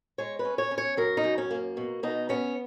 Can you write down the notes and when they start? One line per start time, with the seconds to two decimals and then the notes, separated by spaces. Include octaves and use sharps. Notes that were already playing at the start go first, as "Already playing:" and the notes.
0.18 G#3 C#5
0.39 B4
0.45 C#4
0.58 C#5
0.71 C#4
0.78 C#5
0.97 F#2 A#4
1.17 D#4
1.24 F#2
1.38 C#4
1.51 A#3
1.77 B2
2.03 B2 D#4
2.29 B3 C#4